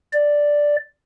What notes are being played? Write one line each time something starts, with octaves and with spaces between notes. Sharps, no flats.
D5